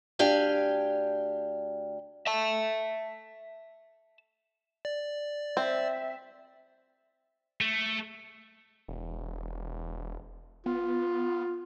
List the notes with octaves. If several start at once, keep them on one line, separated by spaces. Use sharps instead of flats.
D2 D4 G4 F5 G5 G#5
E5 A5
D5
C4 E5
A3
E1
B3 F4